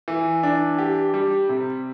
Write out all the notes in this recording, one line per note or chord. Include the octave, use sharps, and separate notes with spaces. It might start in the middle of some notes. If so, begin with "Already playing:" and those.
E3
D4
G4
G3
C3